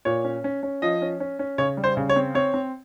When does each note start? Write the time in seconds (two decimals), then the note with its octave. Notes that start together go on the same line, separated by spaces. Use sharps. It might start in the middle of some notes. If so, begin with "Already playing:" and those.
0.05 A#2 C#5
0.24 C#4
0.44 C#4
0.63 C#4
0.82 F3 D#5
1.02 C#4
1.20 C#4
1.39 C#4
1.58 C#3 C#5
1.77 G3
1.84 C5
1.97 C#3
2.09 C#5
2.16 C4
2.35 C4 C#5
2.54 C4